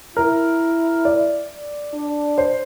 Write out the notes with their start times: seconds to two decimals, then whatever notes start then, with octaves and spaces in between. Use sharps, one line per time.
0.16 E4 A#4
1.05 D5
1.94 D4
2.38 C5